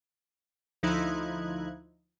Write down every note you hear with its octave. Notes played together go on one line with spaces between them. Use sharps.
D2 F3 D#4 E4 F#6 G#6